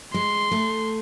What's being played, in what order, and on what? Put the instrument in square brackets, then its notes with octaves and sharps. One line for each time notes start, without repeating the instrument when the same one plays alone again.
[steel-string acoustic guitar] G#3 [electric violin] C6
[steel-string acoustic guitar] A3